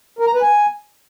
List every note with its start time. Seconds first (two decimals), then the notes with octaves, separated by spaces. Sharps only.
0.19 A#4
0.27 A#5
0.34 B4
0.42 G#5